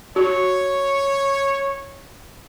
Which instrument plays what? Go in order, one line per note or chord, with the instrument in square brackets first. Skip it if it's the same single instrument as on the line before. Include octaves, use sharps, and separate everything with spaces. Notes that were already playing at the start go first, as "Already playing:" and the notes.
[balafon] F#4 [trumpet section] C#5